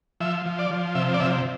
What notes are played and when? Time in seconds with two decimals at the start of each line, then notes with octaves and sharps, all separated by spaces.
0.20 F3 E5
0.46 F3
0.59 D5
0.71 F3
0.95 C3 E5
1.14 D5
1.20 C3 E5